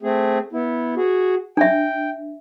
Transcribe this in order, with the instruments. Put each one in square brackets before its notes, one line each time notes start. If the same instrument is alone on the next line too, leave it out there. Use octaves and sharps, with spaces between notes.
[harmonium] A3 C4 G#4
B3 E4
F#4 G#4
[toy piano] D4 E5 [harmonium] G5